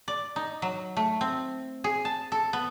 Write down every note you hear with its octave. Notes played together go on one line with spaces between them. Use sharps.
D5
D#4
F#3
A3
C4
G#4
A5
A4
B3